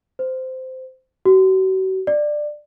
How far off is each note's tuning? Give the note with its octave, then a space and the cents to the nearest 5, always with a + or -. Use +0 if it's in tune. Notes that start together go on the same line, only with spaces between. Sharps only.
C5 -15
F#4 +40
D5 +15